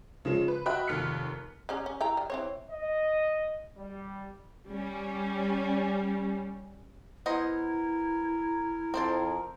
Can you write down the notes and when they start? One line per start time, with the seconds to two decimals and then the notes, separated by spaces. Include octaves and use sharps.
0.25 C#3 F3 G#3
0.48 B4
0.66 F#4 D#5 E5 G5 B5 F#6
0.88 F1 D#2 F6 B6 C#7
1.69 G3 C#4 D#4
1.86 C#4
2.01 E4 G5 A#5
2.17 G3
2.30 E3 C4 C#5
2.71 D#5
3.77 G3
4.69 G3 C#4
7.26 B3 E4 A#4 C5 D#5
8.94 F2 C4 C5 A5